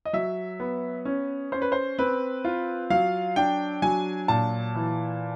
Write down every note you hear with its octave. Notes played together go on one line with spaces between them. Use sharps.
D#5
F#3 E5
B3
C#4
C#4 C5
B4
C5
C4 B4
F4
F#3 F5
D4 G5
F#3 G#5
A#2 A5
E3